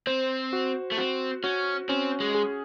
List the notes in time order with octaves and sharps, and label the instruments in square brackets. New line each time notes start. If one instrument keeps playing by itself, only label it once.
[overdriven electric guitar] C4 [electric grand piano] C5
[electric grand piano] F#4
[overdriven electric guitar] A3
[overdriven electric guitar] C4 [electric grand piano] F#4
[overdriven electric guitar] C#4 [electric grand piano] F#4
[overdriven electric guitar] C4 [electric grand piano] C#4
[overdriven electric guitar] G#3
[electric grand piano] G#4